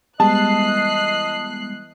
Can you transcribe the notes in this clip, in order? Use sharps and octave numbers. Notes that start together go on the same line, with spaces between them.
E3 G3 G#3 B3 D#5 A5 F#6 C7